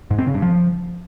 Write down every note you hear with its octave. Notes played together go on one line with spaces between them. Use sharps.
G#2
C4
C#3
G2
F3